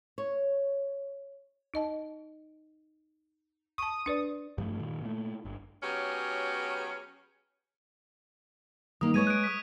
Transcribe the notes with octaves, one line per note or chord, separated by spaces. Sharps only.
C#5
D#4 D#5 A5
A5 C#6 D#6
D4 B4 D5
G2 F3 A3
A#2 D#3
A#2 A3
G1
F#3 B3 C#4 G4 G#4
D#3 A#3 D#6
G#3 B4 C#5 C#6 G#6 D#7
F#6 D7
D#6 B6